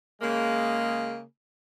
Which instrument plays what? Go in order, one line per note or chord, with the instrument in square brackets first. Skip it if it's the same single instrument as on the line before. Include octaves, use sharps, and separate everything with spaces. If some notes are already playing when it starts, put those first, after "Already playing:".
[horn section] C#3 G#3 A#3